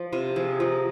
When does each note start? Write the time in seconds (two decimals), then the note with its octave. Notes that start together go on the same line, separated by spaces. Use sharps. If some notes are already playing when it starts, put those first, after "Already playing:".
Already playing: F3
0.13 C3 F4
0.36 F3 G#4
0.60 F3 A#4